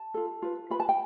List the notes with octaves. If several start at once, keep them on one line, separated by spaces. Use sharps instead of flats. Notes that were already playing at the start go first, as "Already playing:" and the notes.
Already playing: A5
F4 A4
F4 B4
F4 B4 B5
A5
G5